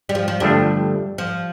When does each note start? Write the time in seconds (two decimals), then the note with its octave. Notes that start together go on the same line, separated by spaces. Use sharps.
0.09 G3
0.15 F3
0.28 F3
0.40 G1 G2 F3 G3 A3 D4
1.18 F3